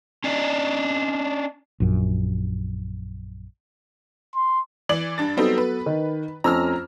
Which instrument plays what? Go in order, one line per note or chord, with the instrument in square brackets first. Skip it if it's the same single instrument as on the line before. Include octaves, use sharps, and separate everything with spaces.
[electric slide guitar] C#4 D4 D5 D#5
[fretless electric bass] A#1 F#2
[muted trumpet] C6
[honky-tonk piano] E3 D5 F#7
G2 D4 A6
[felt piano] F#3 B3 A4 [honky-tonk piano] G3 C4 D#4
[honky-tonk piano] B4
[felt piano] D#3
[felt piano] F2 A3 C#4 [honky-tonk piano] A#5 E6 F6